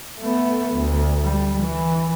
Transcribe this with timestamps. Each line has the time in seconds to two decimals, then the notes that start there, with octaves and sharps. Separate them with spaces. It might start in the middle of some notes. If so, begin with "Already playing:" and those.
0.20 A3 B3
0.76 D2
1.22 G3
1.61 E3